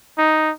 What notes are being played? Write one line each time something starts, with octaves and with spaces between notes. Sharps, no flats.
D#4